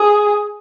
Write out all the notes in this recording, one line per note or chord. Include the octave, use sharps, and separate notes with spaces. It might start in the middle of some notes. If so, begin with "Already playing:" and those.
Already playing: G#4